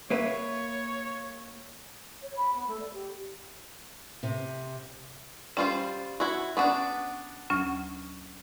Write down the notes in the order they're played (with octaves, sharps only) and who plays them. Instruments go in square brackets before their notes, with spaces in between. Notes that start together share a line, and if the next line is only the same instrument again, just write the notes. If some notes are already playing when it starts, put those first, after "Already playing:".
[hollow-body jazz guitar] A#3 B4 E5 [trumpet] C#5
[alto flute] C#5
B5
B3
A3
D5
G4
[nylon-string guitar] C3
[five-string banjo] G3 F4 C5 [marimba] C#4
[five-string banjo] E4 F#4
[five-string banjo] B3 D4 [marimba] C#4 F#5 C#6
[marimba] D2 F#3 C#4